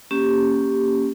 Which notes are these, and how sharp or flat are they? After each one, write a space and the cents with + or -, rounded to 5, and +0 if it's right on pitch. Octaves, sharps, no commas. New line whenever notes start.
A#3 +0 C#4 +0 G4 +0